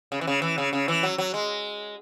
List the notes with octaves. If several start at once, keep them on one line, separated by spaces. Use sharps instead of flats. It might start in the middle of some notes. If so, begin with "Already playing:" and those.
C#3
E3
C#3
E3
C#3
C#3
E3
F#3
F#3
G#3